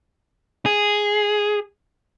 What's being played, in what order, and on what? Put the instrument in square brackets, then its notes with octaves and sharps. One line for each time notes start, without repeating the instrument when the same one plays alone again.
[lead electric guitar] G#4